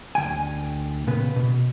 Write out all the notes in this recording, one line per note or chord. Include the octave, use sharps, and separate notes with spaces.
D2 E3 G5 G#5
A#2 C#3 B3 B4
B2